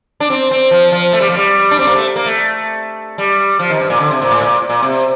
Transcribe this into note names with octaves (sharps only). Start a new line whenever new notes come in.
D4
C4
C4
F3
F3
A3
G3
F3
G3
D4
C4
A#3
A3
A#3
A3
G3
F3
D#3
G2
A#2
D3
C3
A#2
A2
A#2
A#2
C3